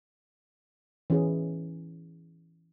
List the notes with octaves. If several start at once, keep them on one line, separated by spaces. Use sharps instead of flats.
E3 C#4 G#4